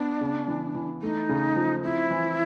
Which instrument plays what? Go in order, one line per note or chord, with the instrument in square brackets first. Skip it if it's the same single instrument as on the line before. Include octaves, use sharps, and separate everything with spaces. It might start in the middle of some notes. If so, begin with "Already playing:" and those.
Already playing: [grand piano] B3 [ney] D4
[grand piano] C#3
E3
E3
[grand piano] A3 [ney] D#4
[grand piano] C#3
F3
[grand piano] C4 [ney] E4
[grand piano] E3